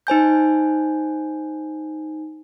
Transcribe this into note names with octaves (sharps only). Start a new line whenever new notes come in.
D#4 C5 G#5 G6